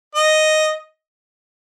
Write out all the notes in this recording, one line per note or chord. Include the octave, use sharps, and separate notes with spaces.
D#5